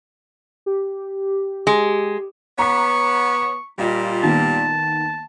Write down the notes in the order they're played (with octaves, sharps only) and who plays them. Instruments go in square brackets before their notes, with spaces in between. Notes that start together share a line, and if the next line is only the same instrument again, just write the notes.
[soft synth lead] G4
[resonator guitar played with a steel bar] G#3
[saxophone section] B3 C#5 [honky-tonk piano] A#5 D6 B6 [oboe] C#6
[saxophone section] A#2 G3 [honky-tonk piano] F4 D#5
[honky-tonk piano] D#3 A#3 B3 [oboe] A5